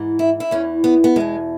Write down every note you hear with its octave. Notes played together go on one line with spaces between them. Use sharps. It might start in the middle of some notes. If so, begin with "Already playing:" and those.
Already playing: G#2 E3
E4
E4
E2 E3 C#4
B3
B3
E2 B2 G#3